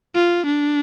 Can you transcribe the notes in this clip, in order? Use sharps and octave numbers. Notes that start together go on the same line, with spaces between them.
F4
D4